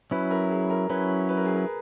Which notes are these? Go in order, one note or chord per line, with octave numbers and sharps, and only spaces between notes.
F#3 C#4 E4 B4
A#4
G#4
A#4
F#3 C#4 E4 B4
B4
A#4
G#4
A#4